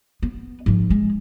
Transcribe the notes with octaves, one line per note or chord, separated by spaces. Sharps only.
B3
G#2 F3
G#3